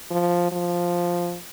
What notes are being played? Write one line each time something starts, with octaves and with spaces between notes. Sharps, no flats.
F3
F3